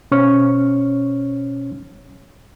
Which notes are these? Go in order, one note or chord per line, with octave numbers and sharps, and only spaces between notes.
B2 C#4 C5 C#5 C#6 F6